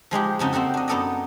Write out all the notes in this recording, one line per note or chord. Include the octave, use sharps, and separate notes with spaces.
F3 G#3 D#4 G4
F2 C#3 D#4 F#4
A#3 C4 D#4 F#4 A4
D4 D#5
F#2 B3 D#4 A4 D5 D#5